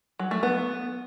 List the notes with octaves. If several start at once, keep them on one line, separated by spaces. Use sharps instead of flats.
F#3
A3
B3